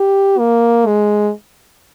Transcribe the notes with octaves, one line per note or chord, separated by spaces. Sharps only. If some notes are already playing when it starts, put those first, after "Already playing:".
Already playing: G4
A#3
G#3